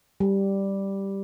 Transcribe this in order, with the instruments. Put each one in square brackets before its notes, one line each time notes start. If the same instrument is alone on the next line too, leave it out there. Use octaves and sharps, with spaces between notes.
[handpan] G3